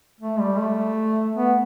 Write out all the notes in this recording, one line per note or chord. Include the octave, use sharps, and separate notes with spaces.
A3
G3
A3
B3